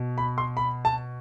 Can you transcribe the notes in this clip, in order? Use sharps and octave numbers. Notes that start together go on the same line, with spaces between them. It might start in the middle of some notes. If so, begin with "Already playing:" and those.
Already playing: B2
B5
C6
B5
A5